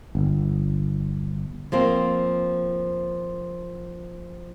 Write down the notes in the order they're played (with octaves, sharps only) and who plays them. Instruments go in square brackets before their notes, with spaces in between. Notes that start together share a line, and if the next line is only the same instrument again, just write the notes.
[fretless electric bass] G1
[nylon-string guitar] F3 A#3 C4